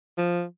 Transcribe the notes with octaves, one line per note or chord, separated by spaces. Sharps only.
F3